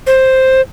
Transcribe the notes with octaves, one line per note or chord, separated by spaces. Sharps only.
C5